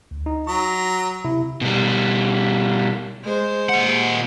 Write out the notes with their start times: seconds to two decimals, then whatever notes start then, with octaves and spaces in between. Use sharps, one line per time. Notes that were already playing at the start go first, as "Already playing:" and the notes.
0.11 D2
0.26 D#4
0.47 F#3 A#5 C#6
1.25 C3 E4
1.61 B2 G3
3.23 G#3 C5
3.69 A#2 F#5